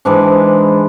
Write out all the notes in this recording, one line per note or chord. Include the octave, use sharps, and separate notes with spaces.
G#2 E3 G#3 D4